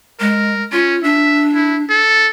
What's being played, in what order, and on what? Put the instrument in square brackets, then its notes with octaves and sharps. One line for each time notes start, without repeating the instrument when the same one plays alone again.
[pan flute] G#3 [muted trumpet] A#4
[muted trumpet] C#4 [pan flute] F4
[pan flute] D4 [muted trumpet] E5
[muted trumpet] E4
A4